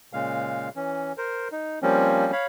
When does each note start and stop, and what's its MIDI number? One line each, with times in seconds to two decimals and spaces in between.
0.13 0.69 46
0.13 0.69 49
0.13 0.69 56
0.13 0.69 77
0.76 1.12 52
0.76 1.12 61
1.18 1.48 70
1.18 1.48 72
1.52 1.79 63
1.82 2.32 53
1.82 2.32 55
1.82 2.32 58
1.82 2.32 60
1.82 2.32 61
2.32 2.47 73
2.32 2.47 77
2.32 2.47 83